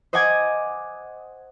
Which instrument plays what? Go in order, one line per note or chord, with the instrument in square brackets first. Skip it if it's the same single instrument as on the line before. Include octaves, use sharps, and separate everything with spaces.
[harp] C5 D#5 F#5 G#5 D6 G#6